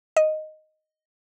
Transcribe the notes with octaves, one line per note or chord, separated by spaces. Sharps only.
D#5